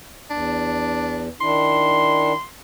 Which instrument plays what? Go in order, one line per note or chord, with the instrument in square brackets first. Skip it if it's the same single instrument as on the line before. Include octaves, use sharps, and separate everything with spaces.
[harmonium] E2 [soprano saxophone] D4
[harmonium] D#3 D4 E4 [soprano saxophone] C6